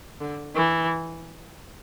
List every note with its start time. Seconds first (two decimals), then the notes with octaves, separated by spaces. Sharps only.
0.21 D3
0.55 E3